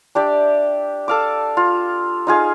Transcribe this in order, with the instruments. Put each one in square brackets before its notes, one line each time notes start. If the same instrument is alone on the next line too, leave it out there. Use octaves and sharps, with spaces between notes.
[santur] D4 G4 D5 E5
A4 F5 D6
F4
D#4 F4 G#4 F5